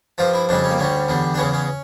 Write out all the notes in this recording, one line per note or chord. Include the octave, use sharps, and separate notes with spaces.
G2 F3 F4
E4
F2 C#3 G3 D4
C#4
A#3
D2 D3 G3 C#4
E2 D3 G3
D4
E2 C#3 E3 C#4
C#4